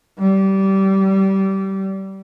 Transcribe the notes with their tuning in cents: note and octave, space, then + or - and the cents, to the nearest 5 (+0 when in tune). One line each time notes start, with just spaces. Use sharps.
G3 -20